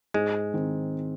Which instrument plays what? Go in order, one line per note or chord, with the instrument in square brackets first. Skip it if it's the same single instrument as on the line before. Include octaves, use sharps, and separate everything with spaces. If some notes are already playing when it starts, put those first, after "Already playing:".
[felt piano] G#2 [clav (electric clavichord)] G#3
[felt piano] D#3 C4